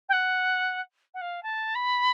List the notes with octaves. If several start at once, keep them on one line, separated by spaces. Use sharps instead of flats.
G5
F#5
F#5
F5
A5
B5